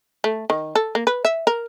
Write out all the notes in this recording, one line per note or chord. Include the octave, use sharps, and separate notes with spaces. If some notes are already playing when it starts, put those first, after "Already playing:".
A3
D#3
A4
A#3
B4
E5
A#4